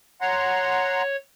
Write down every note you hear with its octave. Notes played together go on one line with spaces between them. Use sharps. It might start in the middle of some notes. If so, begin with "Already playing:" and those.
C#5 F#5 A#5 C6